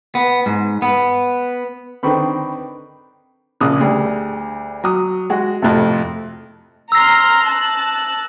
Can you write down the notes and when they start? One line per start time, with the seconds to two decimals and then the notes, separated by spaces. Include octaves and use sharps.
0.15 B3
0.46 G#2
0.82 B3
2.03 D3 D#3 C4 B4 B5 C#6
3.60 A#1 C#3 D#6
3.80 D2 G3 G#4
4.84 F#3 D#6
5.30 G#3 F#4
5.62 F2 A2 C3
6.92 A#5 C6 E6 F6 A#6
7.46 A5 F#6